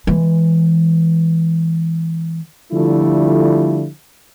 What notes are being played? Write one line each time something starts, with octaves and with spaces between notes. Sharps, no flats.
E3 G#3
D3 F3 G3 A3 E4 F4